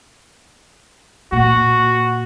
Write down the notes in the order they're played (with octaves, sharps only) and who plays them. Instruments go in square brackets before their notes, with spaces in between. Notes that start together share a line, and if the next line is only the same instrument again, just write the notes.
[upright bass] A#2 [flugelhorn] F#4